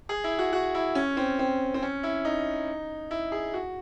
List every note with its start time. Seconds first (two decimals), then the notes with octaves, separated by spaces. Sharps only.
0.09 G#4
0.24 E4
0.39 F#4
0.53 F#4
0.75 E4
0.95 C#4
1.17 C4
1.39 C4
1.74 C4
1.82 C#4
2.03 E4
2.25 D#4
3.11 E4
3.32 G#4
3.54 F#4